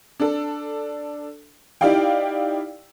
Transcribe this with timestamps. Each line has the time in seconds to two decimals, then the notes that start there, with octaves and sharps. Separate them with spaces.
0.20 D4 A4
1.81 D#4 E4 G4 D5 F5 G5